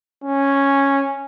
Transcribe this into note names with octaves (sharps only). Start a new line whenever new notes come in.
C#4